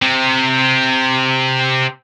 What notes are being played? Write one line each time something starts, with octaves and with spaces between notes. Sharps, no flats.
C3 C4